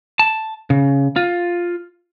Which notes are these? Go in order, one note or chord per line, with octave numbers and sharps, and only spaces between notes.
A5
C#3
F4